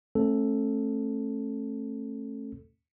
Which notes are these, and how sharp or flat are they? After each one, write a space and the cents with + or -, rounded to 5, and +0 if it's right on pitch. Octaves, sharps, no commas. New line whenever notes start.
A3 +0 C#4 -40 A4 +0